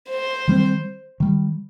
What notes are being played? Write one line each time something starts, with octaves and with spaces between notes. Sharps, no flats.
C5
D#3 G3 C4
D#3 G3